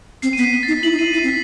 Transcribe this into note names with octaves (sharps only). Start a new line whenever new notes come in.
C4 C7
D#7
B3 B6
C7
B6
A6
D#4
C7
E4 F#7
D#4
E4 D#7
E4 C7
C4
B6